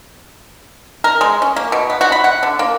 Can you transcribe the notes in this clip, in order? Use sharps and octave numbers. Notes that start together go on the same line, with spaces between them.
A#4
G#3
C#4
A#3
B2
B3
F#4
B5
F#5
D3
A#3